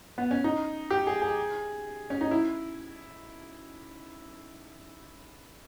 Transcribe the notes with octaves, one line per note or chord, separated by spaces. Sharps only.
B3
C#4
D#4
G4
G#4
G#4
C#4
D#4
E4